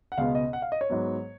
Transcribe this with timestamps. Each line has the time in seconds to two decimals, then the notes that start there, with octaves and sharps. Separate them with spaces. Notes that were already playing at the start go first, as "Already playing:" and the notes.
0.12 F#5
0.18 C#2 B2 G#3 B3 F5
0.35 D#5
0.53 F#5
0.62 F5
0.72 D#5
0.81 C#5
0.90 G#2 F#3 B3